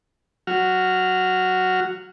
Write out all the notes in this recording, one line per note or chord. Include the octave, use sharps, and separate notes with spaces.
F#3 F#4 F6